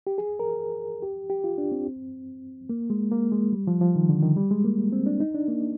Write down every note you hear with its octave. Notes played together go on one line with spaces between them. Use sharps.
G4
G#4
A#4
G4
G4
F4
D4
C4
A#3
G#3
A#3
G#3
G3
F3
F3
D#3
D3
D#3
G3
G#3
A#3
C4
D4
D#4
D4
A#3